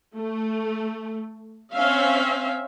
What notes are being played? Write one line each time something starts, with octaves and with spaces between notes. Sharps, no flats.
A3
C4 C#4 E5 F5